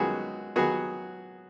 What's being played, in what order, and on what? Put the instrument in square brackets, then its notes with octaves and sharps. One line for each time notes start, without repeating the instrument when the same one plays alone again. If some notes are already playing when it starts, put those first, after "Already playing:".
Already playing: [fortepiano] F#2 D#3 G#3 B3 F#4 G#4
D#3 F#3 B3 F#4 G#4